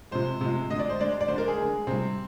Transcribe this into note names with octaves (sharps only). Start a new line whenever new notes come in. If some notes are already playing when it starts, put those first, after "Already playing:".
C3 F3 G#3 C5
C3 F3 G#3
D3 G#3 D#5
D5
C5
D3 G#3 D5
D5
D3 G#3 C5
A#4
G#4
D3 G#3
C3 G3 C4